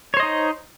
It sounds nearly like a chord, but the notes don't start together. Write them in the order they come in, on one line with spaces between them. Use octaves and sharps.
C#5 C5 D#5 D#4